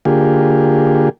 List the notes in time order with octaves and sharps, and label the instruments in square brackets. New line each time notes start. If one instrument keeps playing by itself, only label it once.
[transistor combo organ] D3 A#3 F4 G4 G#4